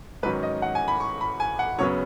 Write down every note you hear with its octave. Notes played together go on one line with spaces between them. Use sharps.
G#2 D#3 F#3 C#4 B4
D#5
F#5
G#5
B5
C#6
B5
G#5
F#5
F#2 C#3 F#3 B3 C#5